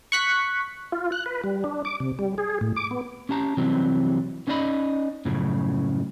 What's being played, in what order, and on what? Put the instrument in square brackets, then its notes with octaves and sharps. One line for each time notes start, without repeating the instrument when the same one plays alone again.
[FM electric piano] C#6 F#6 B6
[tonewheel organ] F4
F#6
B4
G3
D4
D6
C3
G3
G#4
A2
D6
B3
[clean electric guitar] C#4 G4 A5 A#5
C3 E3 F#3 G3 C4
B3 C#4 D#4 D5 D#5 B5
F#2 A2 C#3 F3